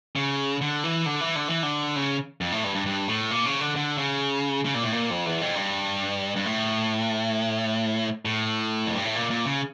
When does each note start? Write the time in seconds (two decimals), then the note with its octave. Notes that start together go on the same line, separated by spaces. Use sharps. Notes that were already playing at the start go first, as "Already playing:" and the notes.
0.16 C#3
0.61 D3
0.84 E3
1.06 D3
1.21 E3
1.36 D3
1.49 E3
1.63 D3
1.96 C#3
2.41 F2
2.52 A2
2.64 G2
2.75 G2
2.86 G2
3.08 A2
3.31 A#2
3.46 C#3
3.61 D3
3.76 D3
3.98 C#3
4.65 C#3
4.75 A#2
4.83 A2
4.92 A#2
5.10 F2
5.26 E2
5.41 F2
5.55 G2
6.36 G2
6.46 A2
8.25 A2
8.86 F2
8.95 G2
9.05 A2
9.15 A#2
9.30 A#2
9.45 C#3